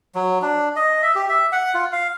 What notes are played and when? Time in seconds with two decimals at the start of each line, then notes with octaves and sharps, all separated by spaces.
0.15 F#3
0.42 D4
0.76 D#5
1.02 E5
1.15 G4
1.29 E5
1.52 F#5
1.74 F4
1.92 F5